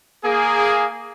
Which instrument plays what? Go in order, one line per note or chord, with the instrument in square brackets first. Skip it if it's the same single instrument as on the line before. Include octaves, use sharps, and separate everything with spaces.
[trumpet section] A#3 G#4